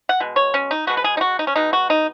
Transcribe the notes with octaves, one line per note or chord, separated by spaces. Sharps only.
F#5
B2 G#3
C#5
C#4
D#4
B2 G#3 B3 F#4
B4
G#4
D#4
F#4
D#4
C#4
B2 G#3 B3 D#4
F#4
D#4